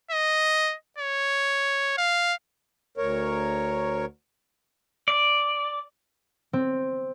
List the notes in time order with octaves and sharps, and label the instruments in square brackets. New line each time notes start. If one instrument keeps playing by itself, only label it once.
[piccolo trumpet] D#5
C#5
F5
[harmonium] D2 A#4 C#5
[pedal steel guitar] D5
[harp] C4